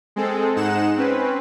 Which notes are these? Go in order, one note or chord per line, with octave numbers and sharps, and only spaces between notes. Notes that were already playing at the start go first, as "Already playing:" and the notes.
G#3 C4 G#4 A4
G#2 G#3 D#4 F#5 E7
C4 C#4 B4